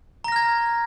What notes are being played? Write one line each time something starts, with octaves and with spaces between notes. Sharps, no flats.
A#5 F6 G#6 A#6